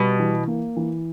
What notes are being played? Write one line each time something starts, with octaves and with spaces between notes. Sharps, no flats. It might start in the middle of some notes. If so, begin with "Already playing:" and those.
Already playing: B2 G3
E3
A#3
E3